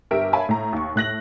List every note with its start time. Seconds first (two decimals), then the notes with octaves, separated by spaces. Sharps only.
0.11 G1 G4 A#4 E5 D7
0.33 C#5 E5 F5 G#5 A5 B5
0.49 A2 A#5
0.73 D#2 C#6
0.96 A2 F#6 A#6 F#7